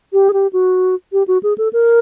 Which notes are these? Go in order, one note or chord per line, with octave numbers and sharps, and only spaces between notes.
G4
G#4
G4
F#4
G4
F#4
G#4
A4
A#4